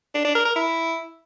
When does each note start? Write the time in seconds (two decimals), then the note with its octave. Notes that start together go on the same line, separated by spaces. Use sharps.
0.14 D4
0.25 D4
0.35 A#4
0.45 A#4
0.55 E4